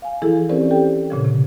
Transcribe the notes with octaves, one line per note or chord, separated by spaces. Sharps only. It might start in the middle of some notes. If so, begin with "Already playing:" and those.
F5 G#5
E3 F3 E4 G#4 A4
C4 C#4 G4 A#4 C5 D5
G4 A4 G5
A#2 C#3 F3
C3